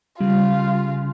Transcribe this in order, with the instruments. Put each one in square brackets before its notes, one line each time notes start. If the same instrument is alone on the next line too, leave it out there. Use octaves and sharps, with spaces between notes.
[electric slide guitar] C#3 [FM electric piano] G3 [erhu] F4